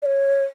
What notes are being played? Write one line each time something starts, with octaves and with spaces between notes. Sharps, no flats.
D5
C#5